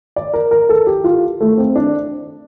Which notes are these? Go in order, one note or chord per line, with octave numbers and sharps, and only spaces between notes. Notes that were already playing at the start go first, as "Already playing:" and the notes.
D5
A#4
A#4
A4
G4
F4
A3
C4
D4